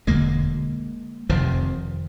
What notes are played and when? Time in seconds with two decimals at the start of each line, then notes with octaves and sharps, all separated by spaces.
0.07 E1 D2 D3 G#3 A#3
1.30 F1 F2 C3 D#3 F3